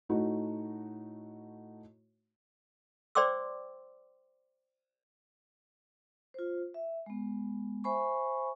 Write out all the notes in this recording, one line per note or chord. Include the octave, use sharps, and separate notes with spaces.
A2 A3 D#4 F#4
C5 D5 G5 C6 D6 E6
F4 C5
E5
G#3 B3
C5 E5 G#5 B5 C#6